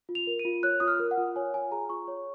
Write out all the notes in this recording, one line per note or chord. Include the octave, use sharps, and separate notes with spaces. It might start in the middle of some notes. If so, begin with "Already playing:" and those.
F4
F7
A#4
D#7
F4
C#5 F#6
F4 D#6
F6
A#4
F#5
F4
C#5 G#5
F4 G#5
G#4 A#5
F4 C#6
C#5